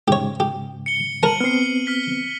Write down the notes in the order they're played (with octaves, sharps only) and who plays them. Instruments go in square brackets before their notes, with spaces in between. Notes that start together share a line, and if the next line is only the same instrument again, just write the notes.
[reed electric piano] G#2 C#3 [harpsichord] G4 C#5
[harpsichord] G4
[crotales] C#7 G7
[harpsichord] A#4 A5 [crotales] D#7 F#7
[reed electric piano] B3 C4 [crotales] F6 C7
[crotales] F6 B6 G7